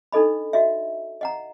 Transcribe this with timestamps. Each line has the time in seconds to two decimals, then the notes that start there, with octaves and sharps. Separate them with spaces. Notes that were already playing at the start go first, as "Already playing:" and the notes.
0.12 D4 D#4 A4 D#5 B5
0.53 F#4 D#5 E5
1.21 D#5 F#5 A#5